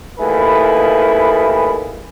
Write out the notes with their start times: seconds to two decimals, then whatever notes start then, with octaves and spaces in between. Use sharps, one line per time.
0.19 D#2 A3 E4 G#4 B4